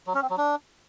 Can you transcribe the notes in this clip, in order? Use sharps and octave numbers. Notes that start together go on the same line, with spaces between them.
F#3
C#4
C4
F#3
D4